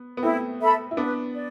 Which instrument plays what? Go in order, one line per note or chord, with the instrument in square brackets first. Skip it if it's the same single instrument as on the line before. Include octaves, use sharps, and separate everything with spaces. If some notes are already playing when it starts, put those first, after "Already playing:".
Already playing: [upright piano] B3
B3
[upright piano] A3 C4 [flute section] E4
[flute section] A4 E5 B5
[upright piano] E4
[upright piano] B3 D4 [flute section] B4
[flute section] D5